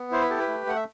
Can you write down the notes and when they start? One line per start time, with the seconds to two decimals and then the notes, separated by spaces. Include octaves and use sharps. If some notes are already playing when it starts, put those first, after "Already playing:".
Already playing: B3
0.11 E4 C5
0.21 B4
0.30 G4 A4
0.40 B4
0.48 A3
0.66 A3 F#5
0.76 E5